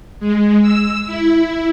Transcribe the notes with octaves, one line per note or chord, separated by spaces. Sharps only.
G#3
E6
E4